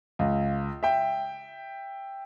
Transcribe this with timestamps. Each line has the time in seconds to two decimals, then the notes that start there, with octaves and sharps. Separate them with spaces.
0.19 C#2
0.83 E5 G5